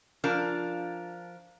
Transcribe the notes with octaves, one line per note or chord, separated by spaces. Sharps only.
F3 D4 F4 A#4